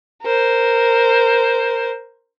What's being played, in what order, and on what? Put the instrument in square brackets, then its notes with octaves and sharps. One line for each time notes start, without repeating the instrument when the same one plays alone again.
[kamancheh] A#4 C5